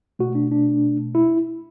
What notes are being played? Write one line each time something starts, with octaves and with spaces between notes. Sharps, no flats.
B2 A3 F#4
D4
D4
E4